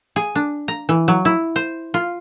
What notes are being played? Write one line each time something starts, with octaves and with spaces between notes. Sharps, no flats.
G#4
D4
A#5
E3
F#3
E4
C5
F4